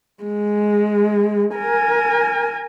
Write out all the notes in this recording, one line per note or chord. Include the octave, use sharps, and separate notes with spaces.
G#3
A#4 G#5